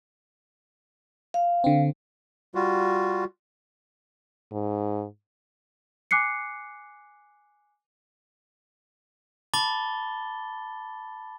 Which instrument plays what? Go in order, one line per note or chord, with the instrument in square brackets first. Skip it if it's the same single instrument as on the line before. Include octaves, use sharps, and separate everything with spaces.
[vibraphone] F5
[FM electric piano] D3 C4
[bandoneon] G3 F4 F#4
[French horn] G#2
[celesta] G#5 D6 F#6 C7 C#7
[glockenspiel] A5 B5 D6 A6 G7